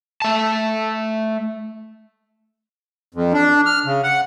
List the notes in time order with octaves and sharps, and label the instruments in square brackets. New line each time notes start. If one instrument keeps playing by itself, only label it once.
[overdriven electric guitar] A3 A5
[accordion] F2
D4
F6
C#3
F#5